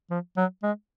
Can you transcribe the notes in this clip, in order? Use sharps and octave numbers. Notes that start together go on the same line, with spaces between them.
F3
F#3
G#3